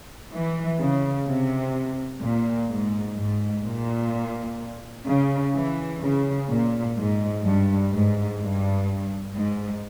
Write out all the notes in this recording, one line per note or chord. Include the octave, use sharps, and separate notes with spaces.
E3
C#3
C3
A#2
G#2
G#2
A#2
C#3
E3
C#3
A#2
G#2
G2
G#2
G2
G#2